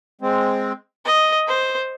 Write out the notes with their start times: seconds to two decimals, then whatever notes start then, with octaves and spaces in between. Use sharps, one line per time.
0.21 G#3 C4
1.05 D#5
1.47 C5